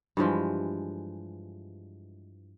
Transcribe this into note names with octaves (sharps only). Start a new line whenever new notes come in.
G2 E3 F3 G#3